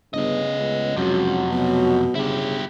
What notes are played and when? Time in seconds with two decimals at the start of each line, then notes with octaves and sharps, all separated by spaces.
0.14 G1 C#3 A3 B3 D#5
0.58 C#2
0.97 F2 C3 F#3 F#4
1.51 B2
2.15 G1 C#3 E4 G4